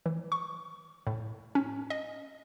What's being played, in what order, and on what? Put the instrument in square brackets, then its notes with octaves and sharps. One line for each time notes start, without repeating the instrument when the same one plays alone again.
[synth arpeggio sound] E3
C#6
A2
C#4
D#5